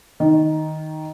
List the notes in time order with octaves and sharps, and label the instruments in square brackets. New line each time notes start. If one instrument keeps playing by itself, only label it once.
[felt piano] D#3